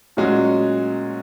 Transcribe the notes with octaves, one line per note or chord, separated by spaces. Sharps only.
A#2 F#3 G#3 C#4 F#4